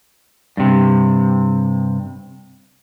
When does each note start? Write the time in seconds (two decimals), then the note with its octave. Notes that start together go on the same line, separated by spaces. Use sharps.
0.57 G2 C3